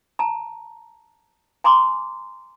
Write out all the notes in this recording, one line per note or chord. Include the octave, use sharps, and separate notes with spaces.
A5 A#5
G#5 A#5 C6 D6